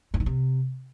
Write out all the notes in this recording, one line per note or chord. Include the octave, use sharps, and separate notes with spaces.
G2
D#3
C3